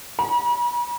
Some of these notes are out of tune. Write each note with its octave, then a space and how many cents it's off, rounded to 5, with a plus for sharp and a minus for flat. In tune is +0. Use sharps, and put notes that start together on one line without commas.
B5 -40